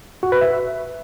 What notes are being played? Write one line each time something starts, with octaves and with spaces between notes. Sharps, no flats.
F#4
B4
E5